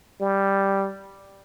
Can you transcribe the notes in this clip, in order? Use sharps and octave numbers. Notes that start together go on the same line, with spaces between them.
G3